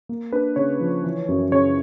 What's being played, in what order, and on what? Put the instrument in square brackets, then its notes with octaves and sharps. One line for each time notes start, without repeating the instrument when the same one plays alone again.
[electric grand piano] A#3
D4 B4
C#3 C#5
F3
E3
F#2
C#3 C#5